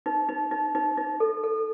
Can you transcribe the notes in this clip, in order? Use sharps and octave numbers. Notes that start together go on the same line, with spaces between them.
D#4
D#4
D#4
D#4
D#4
A4
A4